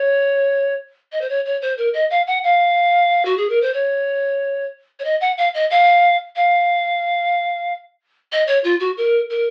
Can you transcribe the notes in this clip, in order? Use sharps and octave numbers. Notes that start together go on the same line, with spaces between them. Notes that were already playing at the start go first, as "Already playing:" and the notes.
Already playing: C#5
D#5
C5
C#5
C#5
C5
A#4
D#5
F5
F#5
F5
F#4
G#4
A#4
C5
C#5
C#5
D#5
F#5
F5
D#5
F5
F5
D#5
C#5
F4
F#4
A#4
A#4